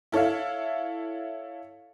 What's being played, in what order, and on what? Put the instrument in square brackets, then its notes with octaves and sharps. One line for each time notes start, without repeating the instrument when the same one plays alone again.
[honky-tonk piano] E4 A4 C#5 E5 F5